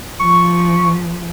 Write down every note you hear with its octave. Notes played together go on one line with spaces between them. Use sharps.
F3 C#6